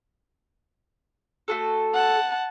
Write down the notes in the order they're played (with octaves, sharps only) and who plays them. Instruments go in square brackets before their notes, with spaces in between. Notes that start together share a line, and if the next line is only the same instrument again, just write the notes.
[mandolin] A3 F#4 A4
[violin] F#5 A5